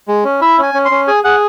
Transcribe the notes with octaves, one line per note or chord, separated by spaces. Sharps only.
G#3
C#4
E4 E5
C#4 G#5
C#4
C6
C#4
G#4 G#5
G#4 F#5